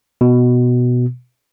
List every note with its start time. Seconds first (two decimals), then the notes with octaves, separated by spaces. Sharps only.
0.21 B2